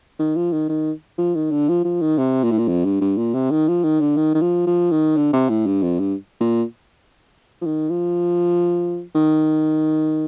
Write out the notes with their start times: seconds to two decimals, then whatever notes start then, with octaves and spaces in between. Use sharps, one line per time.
0.19 D#3
0.36 F3
0.52 D#3
0.69 D#3
1.18 F3
1.35 D#3
1.51 D3
1.69 F3
1.85 F3
2.01 D#3
2.18 C3
2.44 A#2
2.51 A2
2.58 A#2
2.68 F2
2.85 G2
3.01 G2
3.18 A#2
3.34 C3
3.51 D#3
3.68 F3
3.84 D#3
4.01 D3
4.17 D#3
4.35 D#3
4.42 F3
4.67 F3
4.91 D#3
5.17 D3
5.33 C3
5.49 A2
5.67 G2
5.83 F2
6.00 G2
6.41 A#2
7.62 F3
7.66 D#3
7.90 F3
9.15 D#3